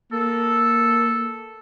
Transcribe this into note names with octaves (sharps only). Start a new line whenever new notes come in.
A#3 A4